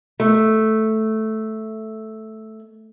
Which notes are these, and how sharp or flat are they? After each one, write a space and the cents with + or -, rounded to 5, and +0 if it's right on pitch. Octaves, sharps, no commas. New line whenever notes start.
A3 -5